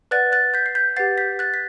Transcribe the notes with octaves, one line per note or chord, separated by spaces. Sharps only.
B4 D5 F#5 F#6 A6
F#6 A6
G6 B6
C7
G6 B6
G4 B4 F#5 A6 C7
G6 B6
F#6 A6
B6